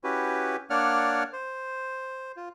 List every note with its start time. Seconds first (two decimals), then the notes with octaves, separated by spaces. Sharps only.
0.04 C#4 E4 F#4 G4 B4
0.70 A#3 D4 C#5 D5 F#5 F6
1.33 C5
2.37 F4